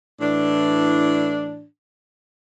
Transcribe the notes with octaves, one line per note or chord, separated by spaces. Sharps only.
A2 E3 D4